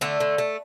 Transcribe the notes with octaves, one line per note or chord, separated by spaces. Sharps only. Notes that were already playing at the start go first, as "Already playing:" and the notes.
D3 A3
D3
A3